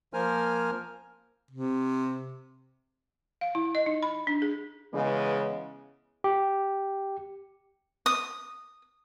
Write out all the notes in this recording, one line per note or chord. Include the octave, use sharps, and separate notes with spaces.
F3 A#3 A#4 C5 G#5 F6
C3
F5
E4
D#5
D#4
B5
D4
G#4
C#3 E3 G#3 B3
G4
D#6